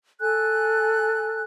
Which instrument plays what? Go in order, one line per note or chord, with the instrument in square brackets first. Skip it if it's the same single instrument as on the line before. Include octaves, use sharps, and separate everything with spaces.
[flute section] A4 G#5 F#6